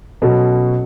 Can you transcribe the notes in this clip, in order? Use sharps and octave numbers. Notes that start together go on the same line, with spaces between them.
B2 F#3 C#4 F#4 A4